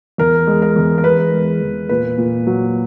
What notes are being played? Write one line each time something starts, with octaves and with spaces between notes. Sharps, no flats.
E2 A#4
G#3
A#4
E2
A#4
E2 B4
G#3
E2
A#2 B4
A#2
F#3